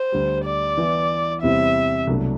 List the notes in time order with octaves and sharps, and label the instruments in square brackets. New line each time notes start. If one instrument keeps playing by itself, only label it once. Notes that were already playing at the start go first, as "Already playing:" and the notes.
Already playing: [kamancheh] C5
[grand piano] D2 D3 G3
[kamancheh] D5
[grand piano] E3 B3 E4
[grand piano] E2 C3 G3 C4 E4 [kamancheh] E5
[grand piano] C2 B2 F#3 A3 D4